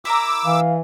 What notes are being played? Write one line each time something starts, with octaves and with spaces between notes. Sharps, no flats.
E4 A#4 A#5 D6 E6
E3 F5